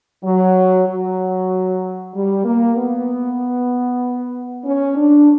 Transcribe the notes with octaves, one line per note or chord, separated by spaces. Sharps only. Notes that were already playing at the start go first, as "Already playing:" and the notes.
F#3
F#3
G3
A#3
B3
C#4
D4